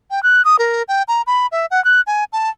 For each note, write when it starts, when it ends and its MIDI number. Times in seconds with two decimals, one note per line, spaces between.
0.11 0.22 79
0.23 0.42 90
0.45 0.56 87
0.59 0.83 70
0.88 1.02 79
1.08 1.22 82
1.27 1.47 83
1.52 1.66 76
1.71 1.83 78
1.84 2.01 90
2.07 2.24 80
2.33 2.50 81